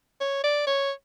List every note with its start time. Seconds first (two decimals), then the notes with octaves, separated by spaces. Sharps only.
0.20 C#5
0.44 D5
0.67 C#5